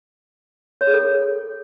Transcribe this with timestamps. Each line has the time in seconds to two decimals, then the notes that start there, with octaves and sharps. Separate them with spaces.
0.81 C#5
0.87 G#4
0.94 A4